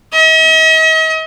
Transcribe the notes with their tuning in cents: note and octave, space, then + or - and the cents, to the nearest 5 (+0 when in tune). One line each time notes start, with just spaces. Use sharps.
D#5 +45